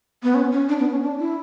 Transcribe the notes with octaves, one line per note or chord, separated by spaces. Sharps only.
B3
C#4
C#4
D4
B3
C#4
D4
E4